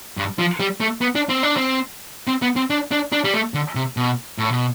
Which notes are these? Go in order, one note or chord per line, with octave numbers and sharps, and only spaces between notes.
G2
F3
G3
A3
B3
D4
C4
D4
C4
C4
B3
C4
D4
D4
D4
G3
A3
D3
C3
B2
A2
B2